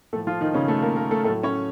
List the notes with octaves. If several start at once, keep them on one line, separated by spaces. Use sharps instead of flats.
A2 F3 A3 A4
F3 F4
D#3 D#4
C#3 C#4
A3 A4
A#3 A#4
A#3 A#4
A3 A4
A2 A3 A4
F#3
C#4 C#5